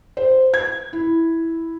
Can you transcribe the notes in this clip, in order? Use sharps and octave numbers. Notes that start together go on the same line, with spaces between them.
C5
G#6
E4